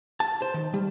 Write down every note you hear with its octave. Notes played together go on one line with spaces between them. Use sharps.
A5
C5
D#3
G3